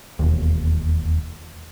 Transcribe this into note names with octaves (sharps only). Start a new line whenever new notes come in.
E1 D#2